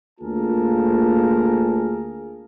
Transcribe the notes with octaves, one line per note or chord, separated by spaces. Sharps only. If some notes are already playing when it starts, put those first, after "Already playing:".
D2 A#3 F4 G#4 A#4 A5